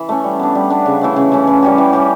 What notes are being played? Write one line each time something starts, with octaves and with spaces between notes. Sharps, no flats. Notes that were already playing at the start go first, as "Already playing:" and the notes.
Already playing: E3
A3 C#4
G3
B3 D4
G3
B3 D4
C#3
E3 A3 C#4
C#3
E3 A3 C#4
E3
G3 C#4 G4
E3
G3 C#4 G4